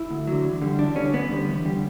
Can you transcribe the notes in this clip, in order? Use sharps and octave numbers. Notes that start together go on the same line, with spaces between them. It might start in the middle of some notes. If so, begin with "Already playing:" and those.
Already playing: E4
D2
D3 F#3
E2
D3 G3
E2 D4
D3 G3 C#4
E2 B3
D3 G3
E2
D3 G3